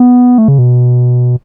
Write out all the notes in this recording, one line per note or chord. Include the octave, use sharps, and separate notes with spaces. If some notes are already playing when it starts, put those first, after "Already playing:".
Already playing: B3
A3
C#3
B2